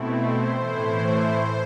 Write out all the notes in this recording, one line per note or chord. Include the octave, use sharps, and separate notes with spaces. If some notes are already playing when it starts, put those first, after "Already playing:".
Already playing: B2 A3 C4 E4
C5
A2 E3 A3 E4 C5